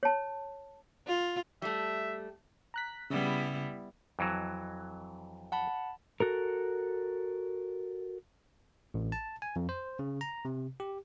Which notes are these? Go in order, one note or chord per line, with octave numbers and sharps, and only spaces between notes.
C#5 A5
F4
G3 A3 E5
A#5 F#6 B6
C#3 G3 B3 E4
F2 E3 F#3
F#5 A5 B5
F#4 A4 A#4
A1
A5
G#5
F2
C5
C#3
A#5
C3
G4